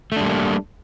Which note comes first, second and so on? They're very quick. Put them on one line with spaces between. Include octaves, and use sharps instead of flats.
A3 D4 G3 A#3